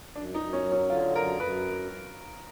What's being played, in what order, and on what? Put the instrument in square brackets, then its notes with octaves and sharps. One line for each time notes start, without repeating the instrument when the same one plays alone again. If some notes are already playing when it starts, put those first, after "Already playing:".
[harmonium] F#2 [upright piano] D4
[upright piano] D#4
[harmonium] F#2
[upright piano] C#4
[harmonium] F#3
[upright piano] C#4
[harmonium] D3 [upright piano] F4
[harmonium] F#2 [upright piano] A#4
[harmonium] F#2 [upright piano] B4